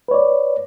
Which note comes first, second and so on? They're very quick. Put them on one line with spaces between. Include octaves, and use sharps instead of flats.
B4 C#5 D5